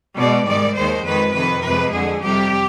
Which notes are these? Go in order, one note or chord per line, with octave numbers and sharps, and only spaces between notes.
B2 G#3 D5
G#2 D#3 G3 D5
D#2 D#3 G#3 C5
F2 D#3 G#3 B4
F2 C3 D#3 B4
F2 C3 F3 G#3 B4
F2 D3 G#3 G#4
F2 C3 G3 G4